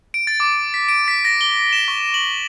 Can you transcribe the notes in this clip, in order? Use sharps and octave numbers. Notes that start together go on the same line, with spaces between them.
D7
A6
D6
B6
D7
B6
A#6
G7
E7
C#6
F#7